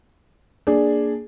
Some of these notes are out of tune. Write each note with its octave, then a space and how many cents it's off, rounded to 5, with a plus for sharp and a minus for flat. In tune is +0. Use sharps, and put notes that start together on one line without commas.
A#3 +0 D4 +0 G#4 +0